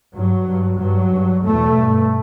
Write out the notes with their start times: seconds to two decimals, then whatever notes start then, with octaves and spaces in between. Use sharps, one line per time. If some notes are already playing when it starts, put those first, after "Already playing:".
0.14 G2 F#3
0.47 G2
0.80 G2 F#3
1.12 G2
1.44 E2 B2 A3
1.76 G2